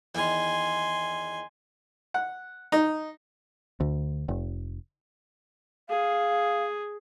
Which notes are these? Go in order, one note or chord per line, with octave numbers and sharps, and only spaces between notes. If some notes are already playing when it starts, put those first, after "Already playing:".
E2 D#3 G#5 C6
F#5
D#4
D2
F1
G#4 F5